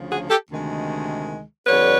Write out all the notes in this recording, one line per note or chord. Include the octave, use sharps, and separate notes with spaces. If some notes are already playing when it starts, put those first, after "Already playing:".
Already playing: D2 C#3 F3
F#4 G#4
G4 A4
D2 C3 D#3 G#3
F2 D3 G3 B4 C#5